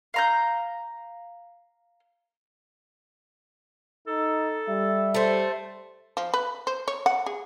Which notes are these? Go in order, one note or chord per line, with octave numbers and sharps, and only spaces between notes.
F5 A#5 G6
D#4 A4
G3 E5
A3 C5
F3
B4
C5
C#5
F#5
G#4